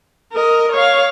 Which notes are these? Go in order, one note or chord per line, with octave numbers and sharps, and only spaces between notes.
A#4 D#5
C#5 F5